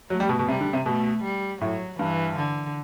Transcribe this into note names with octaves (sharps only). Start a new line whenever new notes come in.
F#3 A3
G3
B2
B2
C3 G3
D3
C3
B2 A3
G3
A2 F#3
G2 E3
D3